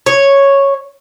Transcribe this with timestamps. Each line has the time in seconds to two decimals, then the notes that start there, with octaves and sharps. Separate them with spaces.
0.06 C#5